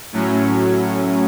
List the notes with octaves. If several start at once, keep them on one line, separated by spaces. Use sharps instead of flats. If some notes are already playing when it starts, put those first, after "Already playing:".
A2 F#3 C#4